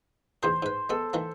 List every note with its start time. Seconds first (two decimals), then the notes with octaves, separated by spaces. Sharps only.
0.43 E2 D#3 G#4 C5
0.63 G#2 B4
0.90 G#3 B3 A4
1.13 D#3 E3 A#3